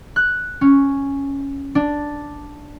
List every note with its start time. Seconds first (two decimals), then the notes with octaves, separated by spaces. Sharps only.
0.16 F#6
0.61 C#4
1.75 D4